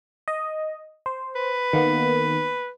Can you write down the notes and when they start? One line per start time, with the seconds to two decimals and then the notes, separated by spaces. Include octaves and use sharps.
0.28 D#5
1.06 C5
1.35 B4
1.73 D#3 A#3 B3